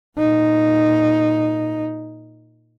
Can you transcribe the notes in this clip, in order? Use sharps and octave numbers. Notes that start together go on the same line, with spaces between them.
A#2 D#4